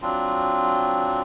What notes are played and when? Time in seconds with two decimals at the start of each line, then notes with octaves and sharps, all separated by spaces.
0.02 F#3 C4 D4 F4